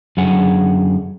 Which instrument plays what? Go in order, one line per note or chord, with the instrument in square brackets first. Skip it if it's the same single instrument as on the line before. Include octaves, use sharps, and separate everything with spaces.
[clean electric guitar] F#2 D3 F#3 G#4 F#5 G#5